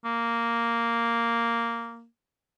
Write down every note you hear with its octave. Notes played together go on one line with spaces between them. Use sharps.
A#3